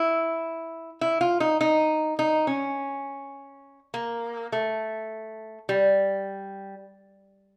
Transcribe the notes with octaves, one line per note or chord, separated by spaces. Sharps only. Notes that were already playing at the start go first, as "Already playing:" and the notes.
Already playing: E4
E4
F4
D#4
D#4
D#4
C#4
A#3
A3
G3